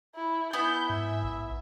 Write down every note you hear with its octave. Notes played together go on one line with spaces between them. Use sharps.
E4
B3 E4 G#5 G6
G#2 E5
A#1